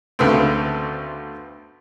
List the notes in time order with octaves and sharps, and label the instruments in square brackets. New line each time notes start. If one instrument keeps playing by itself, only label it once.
[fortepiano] D2 C#3 A3 B3 C4